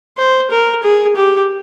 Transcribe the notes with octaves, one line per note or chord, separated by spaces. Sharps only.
C5
A#4
G#4
G4